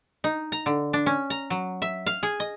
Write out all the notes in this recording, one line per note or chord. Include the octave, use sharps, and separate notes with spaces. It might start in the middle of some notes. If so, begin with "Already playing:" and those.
D#4
A#5
D3
D4
C#4
A#5
F#3
E5
F5
G#4
D#5